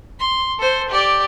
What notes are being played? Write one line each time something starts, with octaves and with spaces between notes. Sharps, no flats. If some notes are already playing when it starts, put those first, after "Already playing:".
C6
A4 C5
G4 D5